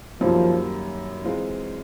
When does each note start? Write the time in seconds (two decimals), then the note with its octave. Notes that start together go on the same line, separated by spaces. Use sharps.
0.21 F#2 D#3 F3 G3 A#3
1.24 E3 G#3 C4 F4